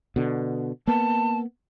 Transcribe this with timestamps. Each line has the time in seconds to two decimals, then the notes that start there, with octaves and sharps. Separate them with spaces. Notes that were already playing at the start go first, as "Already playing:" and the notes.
0.16 B2 D3
0.87 A#3 B3 A5